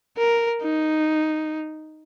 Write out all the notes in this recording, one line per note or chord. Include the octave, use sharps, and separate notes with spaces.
A#4
D#4